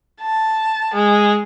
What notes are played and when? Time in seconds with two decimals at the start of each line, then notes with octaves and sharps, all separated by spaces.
0.22 A5
0.94 G#3